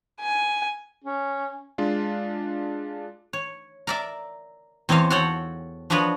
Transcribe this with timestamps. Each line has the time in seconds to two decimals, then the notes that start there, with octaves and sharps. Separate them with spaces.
0.21 G#5
1.04 C#4
1.78 G#3 D4 F4
3.33 C#5
3.87 A#4 D5 E5
4.89 E2 C4 C#5 D#5 F5 A5
5.10 F#4 A4 C#5 F#5 G5
5.90 F3 D4 F#4 B4 C#5 D#5